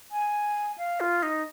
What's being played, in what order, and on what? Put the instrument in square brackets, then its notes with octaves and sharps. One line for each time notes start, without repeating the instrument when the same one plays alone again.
[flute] G#5
F5
F4
D#4